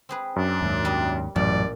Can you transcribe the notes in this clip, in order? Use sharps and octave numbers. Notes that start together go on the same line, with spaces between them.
C4 G#4 B4
F#2 D4
D#2 G#2
G3 D#5
A1 F#2 A#2 F#3 D5